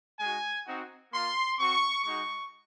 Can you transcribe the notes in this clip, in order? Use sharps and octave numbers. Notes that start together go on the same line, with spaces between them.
G#3 D#4 F#4 G#5
C4 D#4 F#4
A#3 F4 C6
C4 F#4 C#6
G#3 D#4 F#4 C#6